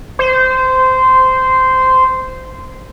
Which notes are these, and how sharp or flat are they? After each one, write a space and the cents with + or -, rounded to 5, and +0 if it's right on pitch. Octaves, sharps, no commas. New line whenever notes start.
C5 -15